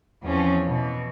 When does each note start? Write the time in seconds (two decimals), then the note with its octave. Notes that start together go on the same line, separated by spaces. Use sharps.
0.23 E2 F3 C4 C#4
0.68 B2 E3